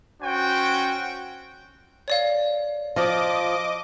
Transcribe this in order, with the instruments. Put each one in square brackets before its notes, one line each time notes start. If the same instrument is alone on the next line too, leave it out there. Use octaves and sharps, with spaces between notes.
[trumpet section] C#4 F#4 C5 G5
[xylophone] C#5 D5 F5
[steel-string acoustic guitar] F3 [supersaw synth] D#5 D6